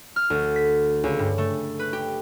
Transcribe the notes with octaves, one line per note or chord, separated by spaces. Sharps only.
F6
D2
B6
C#2
G2
A3
B4
G4